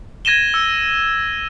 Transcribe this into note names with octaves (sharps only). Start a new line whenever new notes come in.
G#6 A#6 D#7 E7 G7
E6